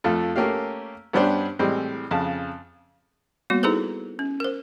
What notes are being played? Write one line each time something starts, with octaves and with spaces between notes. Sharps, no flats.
F2 A3 F4
A3 A#3 C#4 G4 F5
G2 B3 C#4 D4 G4 C5
A2 E3 G3 G#3 C4
F2 C#3 A5
G3 A#3 B3 F#4
D#4 E4 G#4 A4 B4 C5
C#4
A#4 C5